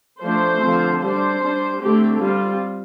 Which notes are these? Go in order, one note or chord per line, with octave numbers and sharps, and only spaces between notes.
F3 A3 D4 C5
D3 F3 C4
G3 D4 C5
G3 D4
D3 A3 C4 G4
G3 C4 F4